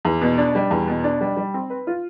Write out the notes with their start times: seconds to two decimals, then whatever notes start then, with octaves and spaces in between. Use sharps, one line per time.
0.05 E2
0.21 B2
0.38 D4
0.55 G3
0.71 E2
0.88 B2
1.04 D4
1.21 G3
1.36 G3
1.54 C4
1.70 B4
1.87 F4